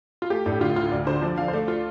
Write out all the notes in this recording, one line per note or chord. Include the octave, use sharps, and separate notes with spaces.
F4
A3 G4
A2 D4
D3 F4
D2 F4
D2 D4
D3 C5
F3 D5
F3 F5
C5
A3 D5
F4